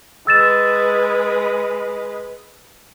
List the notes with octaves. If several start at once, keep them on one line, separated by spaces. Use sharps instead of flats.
G#3 B4 E6 A6 E7